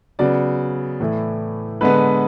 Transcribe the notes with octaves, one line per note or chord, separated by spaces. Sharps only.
C#3 F#3 B3 D5
A2 E3 A3
D3 G#3 B3 B4